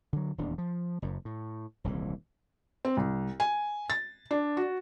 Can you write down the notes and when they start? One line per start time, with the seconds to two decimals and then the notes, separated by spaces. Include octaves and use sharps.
0.13 D3 F#3
0.38 D#1 E2 D4
0.58 F3
1.02 F#1 F#2
1.25 A2
1.84 D#1 C2 A#2 E3
2.85 C4
2.97 C2
3.40 G#5
3.90 A6
4.31 D4
4.57 F#4